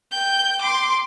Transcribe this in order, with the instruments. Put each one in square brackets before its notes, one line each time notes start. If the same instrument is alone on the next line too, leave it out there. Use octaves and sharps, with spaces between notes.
[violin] G5 G6
C6 D6